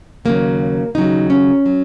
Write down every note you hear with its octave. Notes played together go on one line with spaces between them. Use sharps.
D#2 C#3 F#3 A#3
D#2 C#3 F#3 D#4
C#4
F#3